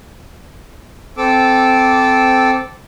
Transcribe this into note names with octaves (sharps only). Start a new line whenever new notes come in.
C4 A4 D6 E6